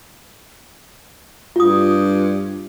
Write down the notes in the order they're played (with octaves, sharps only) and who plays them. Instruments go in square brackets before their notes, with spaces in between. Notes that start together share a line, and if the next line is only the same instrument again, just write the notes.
[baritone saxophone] G2 [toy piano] F4 D#6